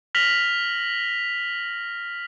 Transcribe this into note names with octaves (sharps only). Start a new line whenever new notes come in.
F6 A#6 B6 F7 F#7